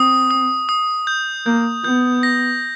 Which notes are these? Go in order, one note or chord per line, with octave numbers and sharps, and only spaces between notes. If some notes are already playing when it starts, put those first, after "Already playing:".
Already playing: C4 D#6
D#6
D#6
G6
A#3 G6
B3 G6
A#6